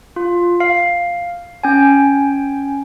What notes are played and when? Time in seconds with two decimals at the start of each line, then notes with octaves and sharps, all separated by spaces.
0.16 F4
0.60 F5
1.63 C#4 G5 G#5